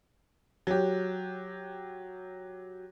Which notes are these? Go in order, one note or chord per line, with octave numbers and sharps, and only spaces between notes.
F#3 G4